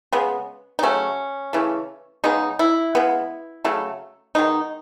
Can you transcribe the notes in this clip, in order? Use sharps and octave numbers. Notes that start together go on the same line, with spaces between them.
C#3 G#3 B3
D#4
C#3 F#3 A3 C#4
C#3 E3 A3
C#3 G#3 B3 D#4
E4
C#3 G#3 B3
C#3 F#3 A3
D#3 G#3 B3 D#4